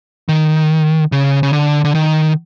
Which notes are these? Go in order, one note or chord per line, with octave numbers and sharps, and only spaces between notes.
D#3
C#3
C#3
D3
D3
D#3